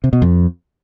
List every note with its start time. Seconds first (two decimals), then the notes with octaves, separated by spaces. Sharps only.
0.04 C3
0.13 B2
0.22 F2